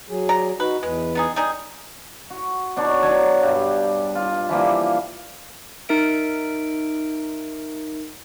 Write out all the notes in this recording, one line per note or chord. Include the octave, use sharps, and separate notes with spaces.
F#3 G#4
D5 A#5
D#4 F#4 B4
E2 G#3 B4
B3 D#4 G#4
G3 D#4 G#4
F#4
B2 D4 D#4 C#5
F#3 D4 G#5 A5
G2 G3
F4
E3 F3 G3 A#3
D#4 A#4 E5 D7